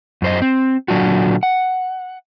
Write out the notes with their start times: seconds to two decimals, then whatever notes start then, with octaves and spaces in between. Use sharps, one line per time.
0.22 F#2 C5 D#5
0.42 C4
0.88 A#2 D3 F#3 D4 F4 F#4
1.43 F#5